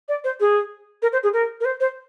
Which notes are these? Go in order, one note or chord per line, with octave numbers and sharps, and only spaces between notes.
D5
C5
G#4
A#4
C5
G#4
A#4
A#4
C5
C5